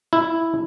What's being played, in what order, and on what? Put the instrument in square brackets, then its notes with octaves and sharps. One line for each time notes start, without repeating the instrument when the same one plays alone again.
[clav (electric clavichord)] E4